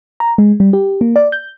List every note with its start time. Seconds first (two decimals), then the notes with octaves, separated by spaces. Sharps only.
0.20 A#5
0.38 G#3
0.60 G3
0.73 G4
1.01 A#3
1.16 D5
1.32 G6